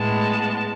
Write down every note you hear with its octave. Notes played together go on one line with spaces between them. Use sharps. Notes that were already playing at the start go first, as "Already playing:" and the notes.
Already playing: A2 G#3 B3 A5